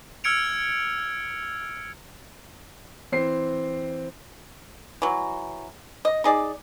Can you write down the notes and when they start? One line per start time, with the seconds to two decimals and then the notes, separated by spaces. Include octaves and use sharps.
0.24 E6 F6 G#6 C#7 D7 F7
3.12 E3 C4 C7
5.02 E3 F#3
6.05 D#5
6.24 D#4 G#4 D5